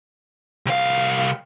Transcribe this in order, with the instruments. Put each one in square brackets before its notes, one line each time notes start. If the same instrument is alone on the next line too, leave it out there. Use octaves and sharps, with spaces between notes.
[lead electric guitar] C2 F5